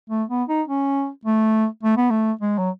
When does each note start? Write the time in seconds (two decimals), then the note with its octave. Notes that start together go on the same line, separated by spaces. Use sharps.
0.10 A3
0.30 B3
0.49 D#4
0.68 C#4
1.25 A3
1.83 A3
1.97 B3
2.10 A3
2.41 G#3
2.58 F#3